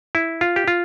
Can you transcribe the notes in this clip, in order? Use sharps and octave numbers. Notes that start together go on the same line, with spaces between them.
E4
F4
G4
F4